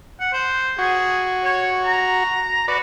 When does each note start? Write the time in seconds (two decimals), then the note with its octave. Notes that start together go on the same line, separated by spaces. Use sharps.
0.20 F#5
0.33 C5
0.78 F#4 G#4
1.44 C#5
1.84 A#5
2.68 F#4 B4 D5